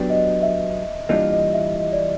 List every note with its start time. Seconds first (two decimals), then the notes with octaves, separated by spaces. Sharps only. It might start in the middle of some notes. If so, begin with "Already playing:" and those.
Already playing: F#3 B3 D4 G4
0.10 D#5
0.42 E5
1.09 E3 G3 A#3 D4 F4 D#5
1.32 D#5
1.54 E5
1.76 D#5
1.93 D5